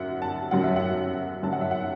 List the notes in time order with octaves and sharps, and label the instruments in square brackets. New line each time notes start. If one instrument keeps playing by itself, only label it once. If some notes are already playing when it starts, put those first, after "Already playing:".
Already playing: [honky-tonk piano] F#2 F#3 E5 F#5
A5
F#2 F#3 F#5
E5
F#5
F#2 F#3 A5
F#5
E5
F#5